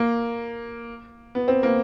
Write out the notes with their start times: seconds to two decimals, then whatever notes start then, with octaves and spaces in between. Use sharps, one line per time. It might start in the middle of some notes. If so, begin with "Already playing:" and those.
Already playing: A#3
1.35 B3
1.48 C4
1.63 A#3